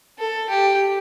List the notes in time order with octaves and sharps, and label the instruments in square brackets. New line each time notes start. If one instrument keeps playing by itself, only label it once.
[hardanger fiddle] A4
G4